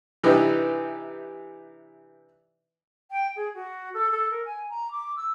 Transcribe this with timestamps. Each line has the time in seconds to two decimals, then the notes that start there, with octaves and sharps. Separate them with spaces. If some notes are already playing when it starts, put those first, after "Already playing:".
0.23 C3 E3 D4 D#4 G4 B4
3.11 G5
3.36 G#4
3.54 F#4
3.94 A4
4.11 A4
4.30 A#4
4.45 G#5
4.69 A#5
4.91 D6
5.16 E6